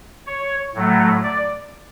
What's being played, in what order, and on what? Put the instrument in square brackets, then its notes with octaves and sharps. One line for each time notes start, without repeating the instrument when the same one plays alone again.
[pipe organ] C#5
A2 F#3 A3
D5